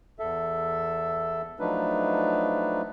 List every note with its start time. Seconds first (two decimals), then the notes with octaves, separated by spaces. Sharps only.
0.19 E2 A4 E5
1.60 F3 F#3 A3 D4 D#4 B4